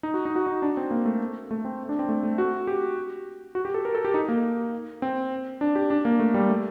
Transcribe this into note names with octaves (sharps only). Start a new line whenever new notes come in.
D#4
F#4
D#4
F#4
D#4
D4
C4
A#3
A3
A3
C4
D4
C4
A3
A3
F#4
G4
F#4
G4
A4
A#4
A4
G4
D#4
A#3
C4
D4
G4
D4
A#3
A3
G3
A3